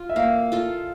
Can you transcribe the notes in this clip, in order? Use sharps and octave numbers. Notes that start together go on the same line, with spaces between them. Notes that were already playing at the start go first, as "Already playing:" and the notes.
Already playing: F4
E5
A#3 F5
F4 A4